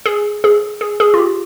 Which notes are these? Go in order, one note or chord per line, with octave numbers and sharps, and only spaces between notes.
G#4
G#4
G#4
G#4
F4
G4